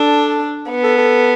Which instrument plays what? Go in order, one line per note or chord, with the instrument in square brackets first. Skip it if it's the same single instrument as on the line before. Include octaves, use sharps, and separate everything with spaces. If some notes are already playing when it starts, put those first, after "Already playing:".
Already playing: [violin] D4 [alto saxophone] A4
[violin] B3
[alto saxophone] A4
A4